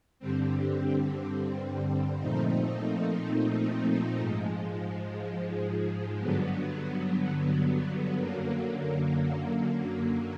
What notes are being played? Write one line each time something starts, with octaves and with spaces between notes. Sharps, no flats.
G2 D3 G3 C4
A#2 F3 A3 C4 D#4
G#2 F3 G#3
G2 D3 F#3 B3
F#2 D3 F#3 A#3